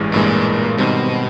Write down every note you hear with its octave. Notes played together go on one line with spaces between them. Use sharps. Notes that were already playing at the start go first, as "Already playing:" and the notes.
Already playing: A1 G2 E3 G#3
A1 G2 A#2 E3 G#3
G#2 B2 D#3 G3 C4